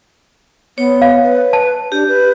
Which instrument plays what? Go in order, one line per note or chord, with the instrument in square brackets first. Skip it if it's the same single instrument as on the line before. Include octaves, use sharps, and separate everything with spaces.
[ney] B3 [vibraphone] C#5
[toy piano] F5
[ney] B4
[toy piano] A5
[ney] D4 [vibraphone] G4
[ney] B4